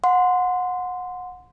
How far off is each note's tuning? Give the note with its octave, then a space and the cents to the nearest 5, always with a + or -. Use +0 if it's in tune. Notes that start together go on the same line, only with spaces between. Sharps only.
F#5 -30 C6 -15